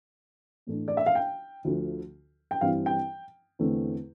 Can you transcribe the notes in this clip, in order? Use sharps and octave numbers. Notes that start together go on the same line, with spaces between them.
A2 E3 A3 D4
D5
E5
F5
G5
D2 D3 F3 A3
G5
G2 E3 G3 C4 E4 F5
G5
E2 D3 A3 C4